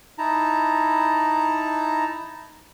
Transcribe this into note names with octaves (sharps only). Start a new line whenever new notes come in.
D#4 E4 A5 A#5